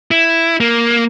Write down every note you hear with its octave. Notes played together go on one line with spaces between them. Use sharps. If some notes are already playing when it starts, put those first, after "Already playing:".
E4
A#3